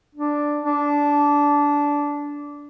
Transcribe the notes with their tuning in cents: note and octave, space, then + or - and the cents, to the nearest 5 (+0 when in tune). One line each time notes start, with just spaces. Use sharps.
D4 +0
D4 -15